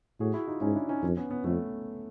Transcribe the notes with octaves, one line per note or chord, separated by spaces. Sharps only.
A2 F#4 G#4
E4 F#4
D#4 F4
G#2 C#4 D#4
D4 E4
C#4 D#4
F2
B3 C#4
B3 C#4
F2 A3 B3